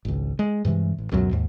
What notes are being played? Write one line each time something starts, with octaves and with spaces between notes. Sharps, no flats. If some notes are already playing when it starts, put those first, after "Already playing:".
G#1 C#2
G#3
G2 C3 E3 G#3
A1
C#2 F#2 B2 F#3
D#2 G#2